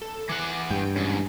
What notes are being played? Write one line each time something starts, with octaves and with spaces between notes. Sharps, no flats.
A4
E3 F#5 D6
G2 G5
E2 G#2 C#4